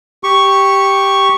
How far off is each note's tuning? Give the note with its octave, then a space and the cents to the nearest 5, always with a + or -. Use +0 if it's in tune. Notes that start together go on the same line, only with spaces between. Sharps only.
G4 +0 C#6 +0